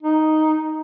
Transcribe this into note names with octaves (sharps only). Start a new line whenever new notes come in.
D#4